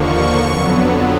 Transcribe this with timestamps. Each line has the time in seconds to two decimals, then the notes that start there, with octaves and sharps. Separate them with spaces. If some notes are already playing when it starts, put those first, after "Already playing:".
Already playing: D#2 D3 F3 A#3 C#6
0.42 F2 D3 F#3 B3